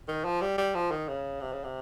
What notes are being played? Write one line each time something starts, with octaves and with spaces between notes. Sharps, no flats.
D#3
F3
G3
G3
F3
D#3
C#3
C3
C#3
C3